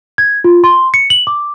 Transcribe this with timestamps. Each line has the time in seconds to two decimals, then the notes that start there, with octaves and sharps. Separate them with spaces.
0.18 G#6
0.44 F4
0.64 C6
0.94 C#7
1.10 F#7
1.27 D6